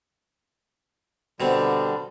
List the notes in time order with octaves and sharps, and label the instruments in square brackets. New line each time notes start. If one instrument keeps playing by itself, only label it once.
[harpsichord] B2 C4 [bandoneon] D3 G3